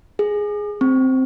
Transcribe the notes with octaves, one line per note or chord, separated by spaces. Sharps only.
G#4
C4